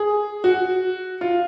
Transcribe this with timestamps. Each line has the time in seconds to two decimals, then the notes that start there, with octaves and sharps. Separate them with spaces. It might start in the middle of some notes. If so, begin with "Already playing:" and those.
Already playing: G#4
0.44 F#4
1.21 F4